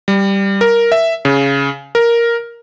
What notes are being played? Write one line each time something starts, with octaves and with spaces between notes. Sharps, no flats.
G3
A#4
E5
C#3
A#4